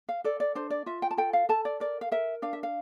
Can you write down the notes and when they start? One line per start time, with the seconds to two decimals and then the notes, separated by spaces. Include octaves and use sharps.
0.09 F5
0.24 A4 D5
0.40 D5
0.55 D4 C5
0.70 D5
0.86 F4 E5
1.02 G5
1.11 A5
1.17 A4 G5
1.33 F5
1.49 A4 A5
1.65 D5
1.80 A#4 D5
2.01 F5
2.12 A#4 E5
2.42 D4 F5
2.53 E5
2.63 F5